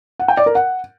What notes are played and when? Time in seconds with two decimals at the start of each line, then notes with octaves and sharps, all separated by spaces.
0.19 F#5
0.28 G5
0.37 D5
0.46 A#4
0.55 F#5